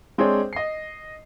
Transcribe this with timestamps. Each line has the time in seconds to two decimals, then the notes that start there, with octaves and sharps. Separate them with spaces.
0.18 G#3 C4 D4 G#4 C5 C#5
0.53 D#5 C7